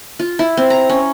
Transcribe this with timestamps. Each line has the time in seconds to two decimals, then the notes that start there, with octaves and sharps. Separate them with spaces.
0.19 F4
0.39 E4
0.57 C4
0.70 A#5
0.89 C#4